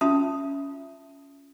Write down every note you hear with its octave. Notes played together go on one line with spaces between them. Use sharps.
C#4 F4 E5 A5 C6 D#6